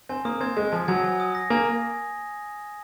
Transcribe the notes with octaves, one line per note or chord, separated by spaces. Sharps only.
C4 G#5
A#3 D#6
C4 G#6
G#3 G#6
F3 G#5
F#3 G#6
G#5
D#6
A#6
A#3 G#5